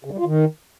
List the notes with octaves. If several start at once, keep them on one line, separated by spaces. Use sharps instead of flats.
C#3
G3
F4
D#3